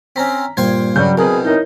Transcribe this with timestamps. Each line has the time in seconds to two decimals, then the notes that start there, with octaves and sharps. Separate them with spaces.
0.16 C4 C#4 A#5 B6
0.57 G2 A#2 C5 F5 G5 G#6
0.96 G2 C#3 F#3 G3 G6
1.18 C2 B2 G#4 A#4 B4
1.45 D#4 E4 A#4 C#5 G6